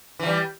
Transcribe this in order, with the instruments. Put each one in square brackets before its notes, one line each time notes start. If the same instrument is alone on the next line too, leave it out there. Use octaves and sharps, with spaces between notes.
[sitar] E3
F3
G3